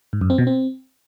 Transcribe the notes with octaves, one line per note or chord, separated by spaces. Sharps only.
G#2
F#2
C4
B2
C4